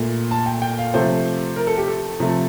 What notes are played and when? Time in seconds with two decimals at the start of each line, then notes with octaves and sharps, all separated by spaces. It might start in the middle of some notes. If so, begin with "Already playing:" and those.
Already playing: A#2 A3
0.31 A5
0.46 G5
0.62 G5
0.79 F5
0.94 C3 F3 A3 C5
1.56 A#4
1.67 A4
1.77 G4
1.88 A4
2.20 C3 F3 A3